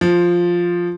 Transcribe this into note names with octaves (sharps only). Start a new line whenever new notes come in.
F3